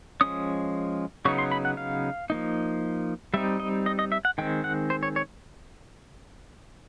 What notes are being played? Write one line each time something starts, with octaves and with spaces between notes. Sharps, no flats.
F3 G#3 C#4 D#6
C#3 F#3 B3 D#4 C#6
C6
B5
F#5
F5
F3 A#3 D#4
G3 C4 D#4 E5
D#5
D#5
D#5
E5
F#5
D#3 G#3 C4 G5
F#5
C5
C#5
C#5